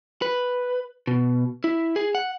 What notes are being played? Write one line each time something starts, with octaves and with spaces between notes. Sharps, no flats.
B4
B2
E4
G#4
F#5